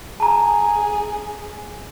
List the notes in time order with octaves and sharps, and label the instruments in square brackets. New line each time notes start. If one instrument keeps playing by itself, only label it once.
[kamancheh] G#4 [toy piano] A5 A#5